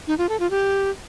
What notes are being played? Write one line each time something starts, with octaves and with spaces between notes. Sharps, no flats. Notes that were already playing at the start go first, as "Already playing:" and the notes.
D#4
F4
A4
F4
G4